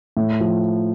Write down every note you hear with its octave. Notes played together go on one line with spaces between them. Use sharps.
A2
F3